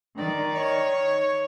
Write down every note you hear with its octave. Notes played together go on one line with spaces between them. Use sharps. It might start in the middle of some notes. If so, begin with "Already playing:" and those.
D#3 D5
C#5